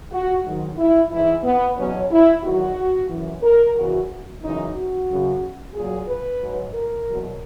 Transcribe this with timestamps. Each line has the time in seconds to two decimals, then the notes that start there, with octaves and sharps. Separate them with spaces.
0.12 F#4
0.45 G#2 D#3 F#3
0.78 E4
1.11 G#2 E3 E4
1.44 B3
1.77 E2 B2 F#3 C#4
2.11 E4
2.43 E2 D#3 F#3 F#4
3.09 F#2 E3
3.43 A#4
3.75 E2 C#3 E3 F#4
4.42 F#2 C#3 E3 D#4
4.75 F#4
5.08 F#2 C#3 F#3
5.74 A#2 F#3 G#4
6.08 B4
6.41 G#2 F#3
6.75 A#4
7.07 E2 B2 F#3